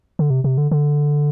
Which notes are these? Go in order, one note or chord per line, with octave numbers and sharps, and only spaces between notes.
D3
C3
C3
D3
D3